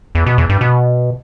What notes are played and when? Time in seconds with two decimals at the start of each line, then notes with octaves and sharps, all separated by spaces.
0.15 E2
0.26 B2
0.38 E2
0.49 G2
0.61 B2